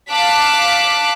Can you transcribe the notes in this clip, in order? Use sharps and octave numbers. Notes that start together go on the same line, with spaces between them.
F5 A5 D6 F#6 B6